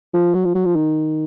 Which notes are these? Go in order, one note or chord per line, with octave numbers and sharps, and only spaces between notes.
F3
F#3
F3
F#3
F3
D#3